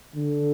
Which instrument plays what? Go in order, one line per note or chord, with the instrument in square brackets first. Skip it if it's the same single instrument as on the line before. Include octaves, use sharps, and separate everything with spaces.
[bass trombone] D3